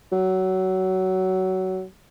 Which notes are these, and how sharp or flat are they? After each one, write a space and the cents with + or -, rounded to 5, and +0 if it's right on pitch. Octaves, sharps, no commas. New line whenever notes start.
F#3 +20